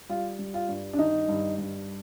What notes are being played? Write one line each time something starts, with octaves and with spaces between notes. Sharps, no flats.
G3 F4
G3
F4
G2
D4
D#3 D#4
G2
G2